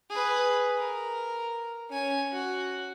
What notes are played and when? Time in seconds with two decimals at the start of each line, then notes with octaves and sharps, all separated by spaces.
0.10 G#4 B4
0.78 A#4
1.90 C#4 G#5
2.33 F#4